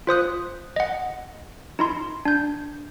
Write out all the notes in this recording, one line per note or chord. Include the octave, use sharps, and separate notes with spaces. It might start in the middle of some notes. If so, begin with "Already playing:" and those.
F4 C5 D#6 F#6
D#5 F#5
D#4 E4 C6
D4 G6